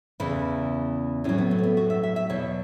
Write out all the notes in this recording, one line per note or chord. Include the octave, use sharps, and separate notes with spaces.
E2 C#3 E3 E4
A2 F#3 C#4
B3
A3
C#4
B3
F#4
E5
E5
E5
E2 B2 F#3 C#5